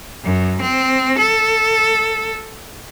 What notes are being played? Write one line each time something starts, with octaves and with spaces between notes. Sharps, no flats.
F#2
C4
A4